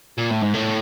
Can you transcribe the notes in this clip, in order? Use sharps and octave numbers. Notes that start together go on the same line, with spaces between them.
A#2
A2
G#2
A2